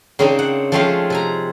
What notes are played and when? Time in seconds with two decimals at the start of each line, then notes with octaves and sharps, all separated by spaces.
0.19 C#3 A#3 C4 D4 D#4
0.39 F#5
0.72 F3 G#3 A3 C4 C#4 F4
1.10 C3 G#5 A#5